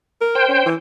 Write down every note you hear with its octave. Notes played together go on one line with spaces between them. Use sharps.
A#4
C5 G5
C#4
E3